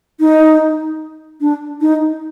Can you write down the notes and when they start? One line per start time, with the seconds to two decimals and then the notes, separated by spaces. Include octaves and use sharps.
0.20 D#4
1.41 D4
1.81 D#4